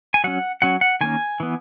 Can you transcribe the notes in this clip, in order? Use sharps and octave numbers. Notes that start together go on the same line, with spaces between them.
G#5
F#3 C#4 F#5
F#3 C#4 F#5
F#5
D#3 A#3 C#4 G#5
E3 B3